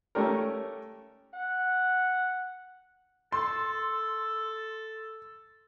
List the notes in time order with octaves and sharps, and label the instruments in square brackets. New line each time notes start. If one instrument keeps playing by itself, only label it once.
[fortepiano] A3 C#4 G4 A#4
[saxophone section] F#5
[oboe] A4 [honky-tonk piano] C6